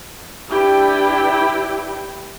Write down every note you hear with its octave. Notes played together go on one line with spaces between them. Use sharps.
D4 E4 G4 B4 G5